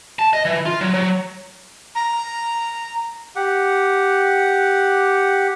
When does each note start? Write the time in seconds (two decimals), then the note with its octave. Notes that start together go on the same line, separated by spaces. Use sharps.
0.19 A5
0.33 D#5
0.45 E3
0.66 F4
0.81 F#3
0.94 F#3
1.95 A#5
3.36 G4 F#5